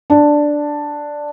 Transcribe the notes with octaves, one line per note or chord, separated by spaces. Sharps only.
D4